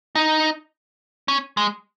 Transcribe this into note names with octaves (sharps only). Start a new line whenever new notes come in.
D#4
C#4
G#3